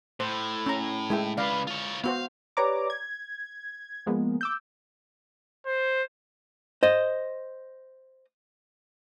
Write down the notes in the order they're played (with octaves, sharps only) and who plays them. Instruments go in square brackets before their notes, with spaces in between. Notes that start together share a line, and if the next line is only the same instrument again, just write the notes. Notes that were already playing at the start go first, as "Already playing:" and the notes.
[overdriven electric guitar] A2 [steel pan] C5
[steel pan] C#4 A#5
G#3 E4 G5
[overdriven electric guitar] C#3 B4 [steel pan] D5 F5
[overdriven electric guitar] F4 C#5
[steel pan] B3 F#4 C5 [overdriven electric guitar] F5
[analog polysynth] G4 B4 C#5 D5 A#5 D6
G#6
F3 G#3 A#3 B3
D6 E6 G6
[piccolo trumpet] C5
[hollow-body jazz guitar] C5 D#5